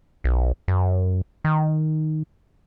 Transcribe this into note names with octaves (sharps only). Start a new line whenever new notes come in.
B1
F#2
D#3